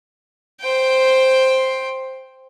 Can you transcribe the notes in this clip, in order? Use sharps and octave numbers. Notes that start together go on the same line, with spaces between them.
C5 G5